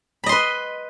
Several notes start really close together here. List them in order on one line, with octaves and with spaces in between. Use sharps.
B5 D#5 C6 B4